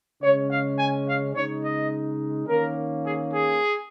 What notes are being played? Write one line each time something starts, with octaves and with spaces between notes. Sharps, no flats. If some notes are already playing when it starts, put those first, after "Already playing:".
C#3 G#3 C#4 C#5
F5
G#5
F5
C#3 G#3 D#4 C#5
D#5
D#3 A#3 C#4 A#4
G#4
G#4